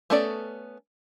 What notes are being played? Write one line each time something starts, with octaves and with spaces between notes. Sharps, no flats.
A3 B3 C#4 A4 D5